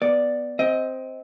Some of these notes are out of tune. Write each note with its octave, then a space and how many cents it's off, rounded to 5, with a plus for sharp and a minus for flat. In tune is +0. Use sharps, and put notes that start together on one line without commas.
B3 +0 D5 +0
C4 +0 D#5 +20